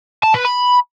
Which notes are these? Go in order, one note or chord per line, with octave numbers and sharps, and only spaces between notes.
A5
B4
B5